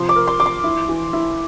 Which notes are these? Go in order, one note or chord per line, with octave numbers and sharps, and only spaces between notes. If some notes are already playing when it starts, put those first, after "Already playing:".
Already playing: C3 F3 C6
D6
A#4
C6
F3 D6
C6
E4
E3
E4